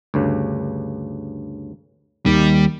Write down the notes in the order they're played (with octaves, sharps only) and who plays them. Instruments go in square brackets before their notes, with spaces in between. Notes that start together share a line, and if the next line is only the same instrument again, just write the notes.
[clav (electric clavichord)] D2 G2 C#3
[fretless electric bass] D#2 D#3 [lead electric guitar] G3